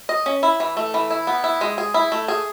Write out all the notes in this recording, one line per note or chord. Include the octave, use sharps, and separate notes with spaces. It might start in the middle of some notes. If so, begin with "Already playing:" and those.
D#5
C#4
E4
E3
A3
E3
E4
B3
E4
G#3
G#4
E4
A3
G#4